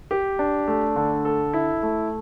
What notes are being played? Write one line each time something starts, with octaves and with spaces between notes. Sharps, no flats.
G4
D4
A3
D3
A4
E4
A3